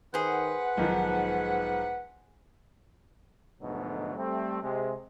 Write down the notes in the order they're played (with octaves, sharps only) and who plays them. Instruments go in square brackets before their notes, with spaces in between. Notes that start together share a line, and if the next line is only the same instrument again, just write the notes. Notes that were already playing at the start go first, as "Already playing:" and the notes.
[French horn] D#3 [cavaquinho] G#4 C5 [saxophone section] B4 F#5
[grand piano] B1 D#3 F3 [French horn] G#2
[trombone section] G#2 B2 D3 F3 F#3 A3
G3 A3 C4
C3 G#3